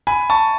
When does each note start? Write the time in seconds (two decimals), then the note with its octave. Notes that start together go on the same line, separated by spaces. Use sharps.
0.07 G#5 B5
0.30 A5 C#6